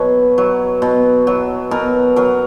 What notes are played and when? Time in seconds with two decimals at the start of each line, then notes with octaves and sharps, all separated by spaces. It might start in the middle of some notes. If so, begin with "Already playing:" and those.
Already playing: B2 F#3 B4 C#5
0.38 F#3
0.82 B2
1.27 F#3
1.71 B2 A#4
2.16 F#3 A#4